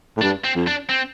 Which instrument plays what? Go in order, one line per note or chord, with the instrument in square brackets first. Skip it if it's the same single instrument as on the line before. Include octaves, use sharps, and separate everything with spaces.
[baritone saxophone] A2
[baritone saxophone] G2 [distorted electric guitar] D4
[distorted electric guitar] C4
[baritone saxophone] F2
[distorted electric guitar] D4
C4